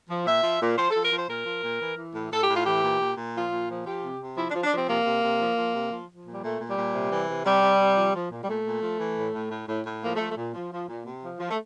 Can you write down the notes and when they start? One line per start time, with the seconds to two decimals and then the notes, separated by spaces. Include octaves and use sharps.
0.09 F3
0.26 A#2 E5
0.43 F3
0.61 A#2
0.77 F3 C5
0.91 A4
0.95 F3
1.03 A#4
1.13 F3 C5
1.29 A#2 A#4
1.46 F3
1.64 A#2
1.81 E3
1.97 E3
2.15 A2
2.32 A2 A4
2.43 G4
2.49 A2 F4
2.65 E3 G4
2.83 A#2
3.00 A#2
3.17 A#2
3.34 F3 F4
3.52 A#2
3.69 F3
3.86 F3 G4
4.04 C3
4.21 C3
4.37 F3 E4
4.50 D4
4.55 F3
4.64 D4
4.72 F3 C4
4.88 C3 A#3
5.05 C3
5.24 C3
5.40 F3
5.57 F3
5.75 C3
5.91 F3
6.09 F3
6.26 A#2
6.32 G3
6.43 A#2 A3
6.61 A#2
6.69 G3
6.78 A#2
6.95 C3
7.12 E3
7.28 C3
7.45 C3 G3
7.63 C3
7.80 C3
7.97 F3
8.14 F3
8.31 A#2
8.44 G3
8.48 A#2 A3
8.65 A#2
8.83 F3
9.00 E3
9.18 A2
9.34 A2
9.51 A2
9.68 A2
9.86 A2
10.03 F3 A#3
10.16 A3
10.20 F3
10.29 A3
10.37 A#2
10.54 F3
10.72 F3
10.88 A#2
11.06 C3
11.22 F3
11.39 F3
11.50 A3